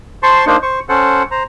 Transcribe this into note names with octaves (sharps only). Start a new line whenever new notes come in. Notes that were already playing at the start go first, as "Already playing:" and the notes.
C5 A5 C6 C#6
A#3 D4 D#4 C5
C5 C#6
C#4 A4 C5 F#5
C5 A#5